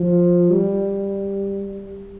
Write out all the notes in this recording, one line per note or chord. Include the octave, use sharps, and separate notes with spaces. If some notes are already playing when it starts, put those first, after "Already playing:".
Already playing: F3
G3